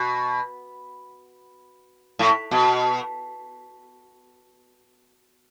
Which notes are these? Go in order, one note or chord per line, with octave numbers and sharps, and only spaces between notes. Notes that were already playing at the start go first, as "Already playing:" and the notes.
Already playing: B2
A2
B2